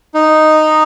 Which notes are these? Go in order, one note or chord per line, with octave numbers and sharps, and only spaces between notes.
D#4